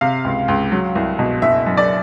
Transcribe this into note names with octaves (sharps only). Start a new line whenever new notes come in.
C3 F5
C#2
C#2
F#3
C2
B2
F#1 E5
F#2
D5